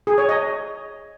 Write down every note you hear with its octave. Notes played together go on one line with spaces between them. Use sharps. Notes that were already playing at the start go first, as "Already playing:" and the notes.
G#4
C#5
D#5